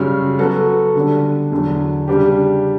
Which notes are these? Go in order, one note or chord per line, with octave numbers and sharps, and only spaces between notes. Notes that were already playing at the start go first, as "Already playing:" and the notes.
Already playing: F#2 C#3 G3 C#4
F#3 B3 F#4 A4
D3 G3 D4
E2 D3 F#3
C#3 G3 D4 G4